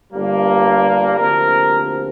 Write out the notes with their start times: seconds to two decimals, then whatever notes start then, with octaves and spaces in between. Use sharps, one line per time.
0.12 G1 G2 D3 G3 A#3
1.17 D2 C3 F3 A#3 A#4